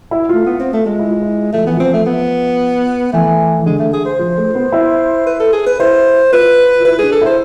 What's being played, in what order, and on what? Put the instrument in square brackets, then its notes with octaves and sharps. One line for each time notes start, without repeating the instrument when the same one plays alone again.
[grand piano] E4
[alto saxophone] A3 [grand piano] F4
[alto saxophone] B3
C4
A3
G#3
[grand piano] E4
F4
E4
[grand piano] F3 [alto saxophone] A3
[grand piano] E3 [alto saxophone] B3
[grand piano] F3 [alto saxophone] C4
[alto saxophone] A3
B3
[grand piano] E3 [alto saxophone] A3
[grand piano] E3
[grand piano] D3 [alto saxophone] G#3
[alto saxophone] A3
G#4
C5
[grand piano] F3
A3
B3
E4
[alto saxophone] B4
A4
G#4
B4
[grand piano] E4 [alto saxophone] C5
[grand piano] F4 [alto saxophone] B4
[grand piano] F4
[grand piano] E4 [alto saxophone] B4
[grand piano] D4 [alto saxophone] G#4
[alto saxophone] A4
[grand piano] E4 [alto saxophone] C5